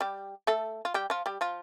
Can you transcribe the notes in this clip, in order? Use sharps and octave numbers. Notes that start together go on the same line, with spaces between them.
G3 G4
A3 A4
F4
G3 G4
F3 F4
G3 G4
F3 F4